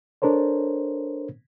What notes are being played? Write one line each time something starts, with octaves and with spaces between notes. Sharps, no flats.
D4 A4 A#4 C5 C#5